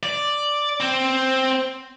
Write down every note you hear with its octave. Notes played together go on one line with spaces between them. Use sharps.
D5
C4